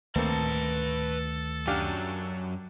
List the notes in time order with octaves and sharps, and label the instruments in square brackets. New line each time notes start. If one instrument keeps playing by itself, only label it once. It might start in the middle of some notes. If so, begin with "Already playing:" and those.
[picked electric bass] D2 D#3 A3 [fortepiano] A#3 C4 [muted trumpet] A4 [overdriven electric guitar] B4 A5
[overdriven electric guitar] F#2 F#3 [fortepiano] D4 G4 F5